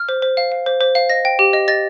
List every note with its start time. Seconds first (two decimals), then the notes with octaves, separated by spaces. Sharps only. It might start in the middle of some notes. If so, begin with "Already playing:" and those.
Already playing: F6
0.09 C5
0.22 C5
0.37 F5
0.52 F5
0.66 C5
0.81 C5
0.95 F5
1.10 D#5 A#6
1.25 G5
1.39 G4
1.53 D#5
1.68 D#5 A6